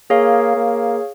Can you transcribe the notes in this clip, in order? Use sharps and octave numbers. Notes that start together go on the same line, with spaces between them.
A#3 G#4 C#5 F5
A#3